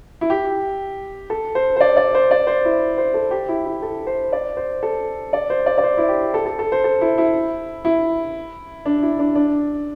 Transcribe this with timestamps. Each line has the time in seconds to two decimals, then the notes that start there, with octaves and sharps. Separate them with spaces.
0.21 E4
0.30 G4
1.30 A4
1.55 C5
1.76 C5
1.81 D5
1.97 D5
2.15 C5
2.31 D5
2.47 C5
2.65 E4
2.98 C5
3.14 A4
3.31 G4
3.49 E4
3.65 E4
3.82 A4
4.07 C5
4.32 D5
4.57 C5
4.83 A4
5.33 D5
5.50 C5
5.66 D5
5.78 D5
5.83 C5
5.97 E4
6.08 G4
6.34 A4
6.46 A4
6.59 A4
6.72 C5
6.84 A4
7.01 E4
7.18 E4
7.85 E4
8.85 D4
9.02 E4
9.19 D4
9.35 D4